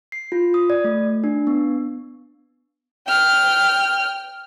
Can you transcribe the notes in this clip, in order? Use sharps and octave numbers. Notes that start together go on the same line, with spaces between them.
C7
F4
D#6
D5
A3
D4
B3
G5 F6